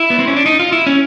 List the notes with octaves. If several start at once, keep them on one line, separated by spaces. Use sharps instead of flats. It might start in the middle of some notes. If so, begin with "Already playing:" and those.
Already playing: E4
B3
C4
C#4
D4
D#4
F4
E4
C#4